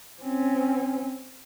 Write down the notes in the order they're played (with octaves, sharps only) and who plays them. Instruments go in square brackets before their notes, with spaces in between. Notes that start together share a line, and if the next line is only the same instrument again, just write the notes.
[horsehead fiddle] C4 C#4